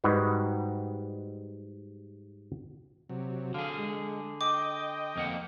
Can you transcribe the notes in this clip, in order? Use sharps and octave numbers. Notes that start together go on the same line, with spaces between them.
G#2 G3 D#4 F#4 B4
C3 F#3
D3 G#4 F5
G#3
D#5 G5 D6
F2 A#3 F#5